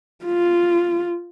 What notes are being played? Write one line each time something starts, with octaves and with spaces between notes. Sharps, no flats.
F4